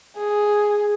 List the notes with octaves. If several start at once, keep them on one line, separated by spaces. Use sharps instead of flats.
G#4